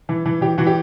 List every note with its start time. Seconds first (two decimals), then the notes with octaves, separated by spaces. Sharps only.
0.09 E3
0.26 E3
0.41 E3 G4
0.58 E3 F#4
0.67 G4